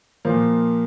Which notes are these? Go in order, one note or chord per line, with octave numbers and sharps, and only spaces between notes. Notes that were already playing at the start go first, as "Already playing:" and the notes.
A#2 F3 A#3